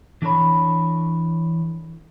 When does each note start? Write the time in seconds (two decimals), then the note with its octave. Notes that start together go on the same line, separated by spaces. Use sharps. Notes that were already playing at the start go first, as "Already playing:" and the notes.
0.22 E3 D4 A4 C#5 B5